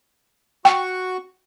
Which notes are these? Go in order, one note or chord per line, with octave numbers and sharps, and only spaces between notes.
F#4 G5 C#6